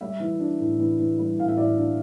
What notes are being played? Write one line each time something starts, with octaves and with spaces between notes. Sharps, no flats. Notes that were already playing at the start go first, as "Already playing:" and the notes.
G3 E5
E3
D4
A2
E3
E3
G3
A2 F5
E5
A2 D5
D4